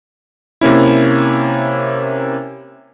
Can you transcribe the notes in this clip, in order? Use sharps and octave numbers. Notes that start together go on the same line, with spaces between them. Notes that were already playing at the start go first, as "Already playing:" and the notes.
C3 A#3 C#4 E4